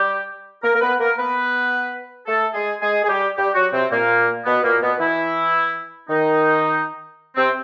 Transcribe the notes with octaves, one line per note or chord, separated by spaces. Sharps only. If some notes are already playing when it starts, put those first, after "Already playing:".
Already playing: G3 G4
A#3 A#4
A#4
B3 B4
A#3 A#4
B3 B4
A3 A4
G#3 G#4
G#3 G#4
G#4
G3 G4
G3 G4
F#3 F#4
C3 C4
A#2 A#3
B2 B3
A#2 A#3
B2 B3
E3 E4
D#3 D#4
C3 C4